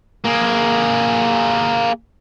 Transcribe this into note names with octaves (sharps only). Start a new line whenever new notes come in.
A#3 G#4